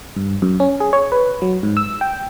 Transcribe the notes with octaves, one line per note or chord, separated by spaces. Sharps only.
G2
F#2
C#4
G#4
C#5
B4
F#3
G#2
E6
G5